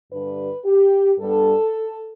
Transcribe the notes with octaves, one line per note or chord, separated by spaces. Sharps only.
G2 D3 G3 D4 B4
G4
G2 G3 B3 D4 A4